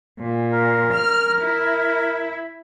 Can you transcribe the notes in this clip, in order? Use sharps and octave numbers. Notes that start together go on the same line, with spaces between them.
A#2
A#4
F6
E4